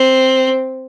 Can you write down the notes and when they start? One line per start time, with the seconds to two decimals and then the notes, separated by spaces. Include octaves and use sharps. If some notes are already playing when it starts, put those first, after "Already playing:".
Already playing: C4